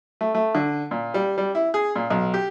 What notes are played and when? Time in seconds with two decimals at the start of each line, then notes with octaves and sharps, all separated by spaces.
0.21 A3
0.35 A3
0.55 D3
0.91 A#2
1.14 G3
1.38 G3
1.55 E4
1.74 G#4
1.96 A#2
2.10 B1
2.34 G4